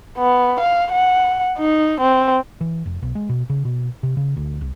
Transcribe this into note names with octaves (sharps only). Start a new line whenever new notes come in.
B3
F5
F#5
D#4
C4
E3
F1
B1
G#3
B2
C#3
B2
C3
C#3
D2
C2